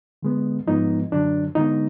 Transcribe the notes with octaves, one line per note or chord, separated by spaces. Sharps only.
D3 G#3 B3
G#2 F3 G#3 B3 D#4
F#2 D3 F#3 D4
D3 G#3 B3 D#4